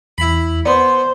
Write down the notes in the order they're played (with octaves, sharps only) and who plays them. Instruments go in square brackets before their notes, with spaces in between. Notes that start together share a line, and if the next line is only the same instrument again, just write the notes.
[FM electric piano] E2 [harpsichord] E4 B5
[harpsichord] B3 [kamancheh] C5 [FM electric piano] D5 C6